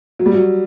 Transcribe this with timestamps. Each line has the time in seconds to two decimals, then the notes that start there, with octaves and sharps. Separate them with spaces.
0.19 F#3
0.26 G3
0.34 F#3